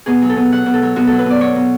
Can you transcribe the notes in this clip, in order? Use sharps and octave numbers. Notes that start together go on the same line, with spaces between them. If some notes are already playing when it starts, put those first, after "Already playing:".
B2 G#4
F#3
A4
B2
F#3 F#5
B2
A4
F#3
B2 F#4
F#3 A4
B4
B2 D5
F#3 C#5
B2